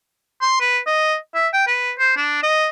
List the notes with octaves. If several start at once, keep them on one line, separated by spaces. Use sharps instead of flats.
C6
B4
D#5
E5
G5
B4
C5
D4
D#5